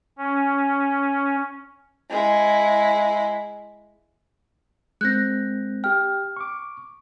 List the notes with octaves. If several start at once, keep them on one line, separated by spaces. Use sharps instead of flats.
C#4
G#3 E4
G#3 C4 F#6 G6 A#6
G4 G5 F6
C#6 D6